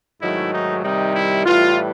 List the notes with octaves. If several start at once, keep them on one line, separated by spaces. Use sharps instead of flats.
G#2 D#3 F#3 A3 E4
D#4
C3 D#3 G3 D#4
E4
A2 E3 G3 F4